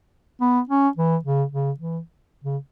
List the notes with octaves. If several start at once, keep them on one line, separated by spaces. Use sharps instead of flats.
B3
C#4
E3
C#3
C#3
E3
C#3